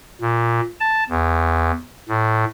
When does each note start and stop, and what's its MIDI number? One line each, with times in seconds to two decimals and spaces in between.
0.21 0.61 46
0.80 1.04 81
1.10 1.71 40
2.09 2.45 45